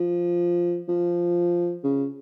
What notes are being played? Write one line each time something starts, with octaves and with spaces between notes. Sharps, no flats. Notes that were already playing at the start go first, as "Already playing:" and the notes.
Already playing: F3
F3
C#3